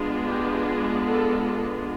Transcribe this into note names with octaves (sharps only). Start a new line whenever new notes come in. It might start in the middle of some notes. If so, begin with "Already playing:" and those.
Already playing: G#3 B3 D4 F4
G4
G#4
A4